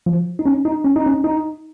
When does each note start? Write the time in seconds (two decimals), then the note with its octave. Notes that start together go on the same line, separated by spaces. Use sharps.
0.06 F3
0.39 D#4
0.46 C#4
0.65 D#4
0.85 C#4
0.96 D#4
1.06 C#4
1.24 D#4